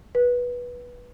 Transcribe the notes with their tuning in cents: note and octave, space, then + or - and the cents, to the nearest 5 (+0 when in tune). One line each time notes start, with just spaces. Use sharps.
B4 -15